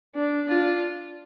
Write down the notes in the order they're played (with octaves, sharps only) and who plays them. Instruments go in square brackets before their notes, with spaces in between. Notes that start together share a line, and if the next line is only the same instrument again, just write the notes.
[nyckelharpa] D4
[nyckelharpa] D4 [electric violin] F4